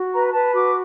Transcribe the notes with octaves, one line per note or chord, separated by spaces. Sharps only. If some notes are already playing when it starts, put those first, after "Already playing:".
Already playing: F#4
B4 A#5
A#5
B4 A5
F#4 D6